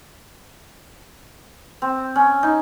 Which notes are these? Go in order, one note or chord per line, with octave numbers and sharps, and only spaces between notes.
C4
C#4
D#4